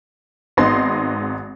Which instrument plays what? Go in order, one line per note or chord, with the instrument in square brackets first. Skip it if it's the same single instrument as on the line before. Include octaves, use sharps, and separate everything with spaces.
[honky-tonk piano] G#1 G#2 B3 D#4 C6 A#6